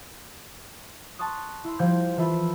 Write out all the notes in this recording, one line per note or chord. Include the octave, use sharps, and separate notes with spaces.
A5 C6 C#6 D#6 F#6
E4 C6
F3 G3 D6 G6 G#6
E3 F4 A4 E5 B5